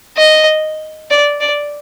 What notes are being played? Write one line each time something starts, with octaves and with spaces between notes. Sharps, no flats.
D#5
D5
D5